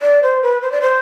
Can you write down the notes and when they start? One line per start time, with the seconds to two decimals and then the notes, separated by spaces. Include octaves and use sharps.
0.02 D5
0.23 C5
0.42 B4
0.62 C5
0.72 D5
0.82 C5